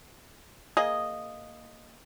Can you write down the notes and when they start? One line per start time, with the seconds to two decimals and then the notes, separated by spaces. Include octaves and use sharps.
0.77 A#3 G#4 D#5